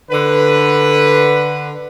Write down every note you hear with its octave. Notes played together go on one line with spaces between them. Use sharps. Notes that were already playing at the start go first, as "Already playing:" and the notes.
D3 B4